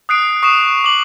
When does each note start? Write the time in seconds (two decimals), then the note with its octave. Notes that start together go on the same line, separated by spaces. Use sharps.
0.09 D#6 F#6 C7 D7
0.43 C#6 D#6 C7 E7
0.84 D6 F#7